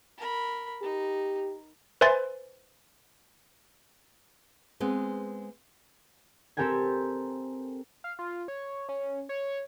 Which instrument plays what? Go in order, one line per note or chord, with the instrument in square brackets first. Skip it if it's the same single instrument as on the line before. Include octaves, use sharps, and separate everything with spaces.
[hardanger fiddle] A#4 B5
[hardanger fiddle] D#4 [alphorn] G4
[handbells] B4 C5 E5 G#5 C6 A6
[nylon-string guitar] G#3 B3 C4
[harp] C4 G4 A4 A#4 G5 G#5
[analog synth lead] F5
F4
C#5
C#4
C#5